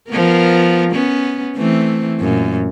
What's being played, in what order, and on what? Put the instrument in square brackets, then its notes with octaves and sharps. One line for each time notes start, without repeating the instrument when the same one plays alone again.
[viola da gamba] F3 B3 A#4
B3 C#4
E3 A3 C4
F#2 A#2